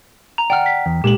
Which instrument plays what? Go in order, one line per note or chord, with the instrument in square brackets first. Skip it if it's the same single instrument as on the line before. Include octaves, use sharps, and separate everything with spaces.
[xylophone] A#5
[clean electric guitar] D5 F#5 [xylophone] G5 F6
[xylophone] B6
[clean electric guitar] E2
[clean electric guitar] A#2 G#3 [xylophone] G4 F#7